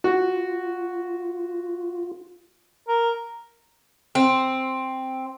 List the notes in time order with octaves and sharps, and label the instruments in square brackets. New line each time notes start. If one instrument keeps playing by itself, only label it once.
[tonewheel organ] F4 [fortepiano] F#4
[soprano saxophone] A#4
[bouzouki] C4